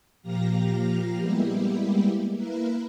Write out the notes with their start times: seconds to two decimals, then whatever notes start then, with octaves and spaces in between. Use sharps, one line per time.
0.22 A#2 F3 G4 F5 A#5 A#6
1.19 G3 G#3 A#3 B3 E4 G4
2.33 A#3 E4 A#4 B4